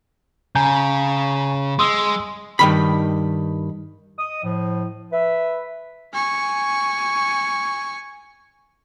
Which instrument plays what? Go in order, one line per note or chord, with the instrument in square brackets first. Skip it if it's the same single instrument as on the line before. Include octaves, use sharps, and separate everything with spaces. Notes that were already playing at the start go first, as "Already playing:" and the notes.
[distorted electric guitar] C#3 [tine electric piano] G#5 A#5 G6
[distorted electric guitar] G#3 [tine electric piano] C6 D#6 E6
[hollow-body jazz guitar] G2 D#3 B5
[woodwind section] D#5 D#6
A2 F3
B4 E5
[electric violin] G#5 C#6